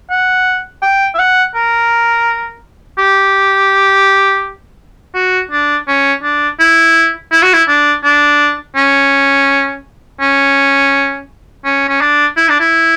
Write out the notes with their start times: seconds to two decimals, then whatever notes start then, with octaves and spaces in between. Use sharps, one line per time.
0.10 F#5
0.82 G5
1.14 E5
1.19 F#5
1.55 A#4
2.98 G4
5.15 F#4
5.51 D4
5.88 C#4
6.23 D4
6.60 E4
7.32 E4
7.42 F#4
7.53 E4
7.68 D4
8.03 D4
8.75 C#4
10.20 C#4
11.65 C#4
11.89 C#4
12.01 D4
12.37 E4
12.49 D4
12.60 E4